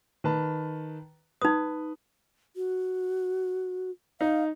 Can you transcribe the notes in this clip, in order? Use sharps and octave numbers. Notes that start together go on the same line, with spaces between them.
D#3 B4 A5
D#4 B4 D#6
F#4
D#4 F5